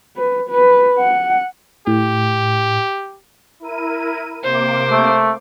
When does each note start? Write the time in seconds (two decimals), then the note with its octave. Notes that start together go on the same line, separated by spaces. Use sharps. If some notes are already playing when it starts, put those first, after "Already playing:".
0.17 B4
0.49 B4
0.99 F#5
1.87 A2 G4
3.60 E4 A#4 D#7
4.44 C3 A#3 C5 D6
4.91 A3